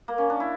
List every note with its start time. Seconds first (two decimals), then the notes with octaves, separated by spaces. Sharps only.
0.08 A#3
0.18 C#4
0.30 D4
0.40 E4